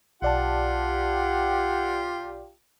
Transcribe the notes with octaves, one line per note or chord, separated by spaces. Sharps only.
B1 F4 G4 D5 F#5 A5